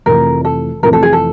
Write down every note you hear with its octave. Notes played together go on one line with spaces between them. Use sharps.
F1 F2 C3 E3 A3 A#4
A4
F1 F2 C3 E3 A3 A#4
A4
G#4
A4